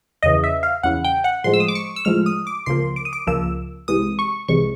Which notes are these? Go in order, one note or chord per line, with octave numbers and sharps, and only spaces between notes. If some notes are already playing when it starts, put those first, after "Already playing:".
E2 C#3 E3 D#5
E5
F5
E2 C#3 E3 F#5
G5
F#5
A2 F3 G#3 C6
E6
D#6
D6
C#6
E6
A2 F3 G#3 F6
D#6
D6
C#2 C#3 F3 A#3 C6
D6
D#6
D6
C#2 C#3 F3 A#3 E6
C2 C3 E3 G#3 D#6
C#6
C2 C3 E3 G#3 C#6